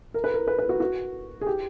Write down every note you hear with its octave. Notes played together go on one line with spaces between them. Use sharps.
A#4
B4
A#4
B4
B4
F#4
F#4
G#4
G4